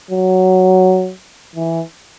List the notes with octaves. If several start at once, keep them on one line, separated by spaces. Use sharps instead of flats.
F#3
E3